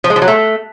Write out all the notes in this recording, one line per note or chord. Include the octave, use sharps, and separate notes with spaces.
F3
G#3
F3
F#3
A3